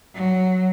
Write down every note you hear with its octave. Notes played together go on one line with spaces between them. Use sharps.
F#3